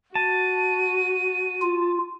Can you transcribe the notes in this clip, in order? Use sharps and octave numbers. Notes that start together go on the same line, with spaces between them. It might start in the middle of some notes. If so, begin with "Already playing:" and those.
F#4 A5 D#7
F4